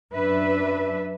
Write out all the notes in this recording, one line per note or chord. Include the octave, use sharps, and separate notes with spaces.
F#2 D4 B4 E5